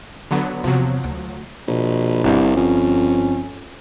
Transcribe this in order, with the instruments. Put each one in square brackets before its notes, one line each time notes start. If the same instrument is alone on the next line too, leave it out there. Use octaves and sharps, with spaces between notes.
[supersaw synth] D3 F#3 B3
[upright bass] E2 C3 [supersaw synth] F3 F#3
[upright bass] D2
[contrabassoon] A#1 [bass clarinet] B2
[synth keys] G1 G2 [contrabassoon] C2
[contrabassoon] F2 [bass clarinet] C#4